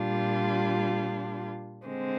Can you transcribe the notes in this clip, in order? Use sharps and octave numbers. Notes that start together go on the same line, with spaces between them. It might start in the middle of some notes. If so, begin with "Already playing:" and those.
Already playing: A#2 G3 D4 F4
D3 G#3 C4